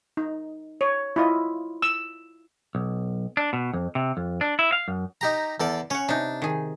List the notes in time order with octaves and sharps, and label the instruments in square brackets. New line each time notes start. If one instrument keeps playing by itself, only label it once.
[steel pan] D#4
C#5
E4 F4 D#5
E6
[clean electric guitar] B1
D4
B2
F2
C3
F2
D4
E4
F5
F#2
[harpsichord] D#4 G4 A#5
E2 A4 D5
[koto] C#4 F#5 [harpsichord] C#5
[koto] C3 D#4 [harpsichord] D4
[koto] D#3 G#4